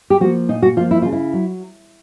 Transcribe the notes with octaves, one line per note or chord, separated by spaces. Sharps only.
G4
F3 A#3 F#4
A#2 D#4
F#4
F3 A#3 F4
E4
C#3 F4
E4
F#3